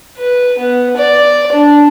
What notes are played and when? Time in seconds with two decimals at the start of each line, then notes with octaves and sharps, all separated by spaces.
0.18 B4
0.58 B3
0.97 D5
1.52 D4